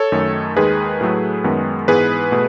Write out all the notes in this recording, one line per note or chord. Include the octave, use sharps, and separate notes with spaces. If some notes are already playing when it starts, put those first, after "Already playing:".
Already playing: A4 C#5
F#2 D#3 A3
D#2 D#3 G#3 G#4 B4
A2 F#3 A3
F#2 D#3 G#3 B3
G#2 E3 B3 G#4 B4
B2 A3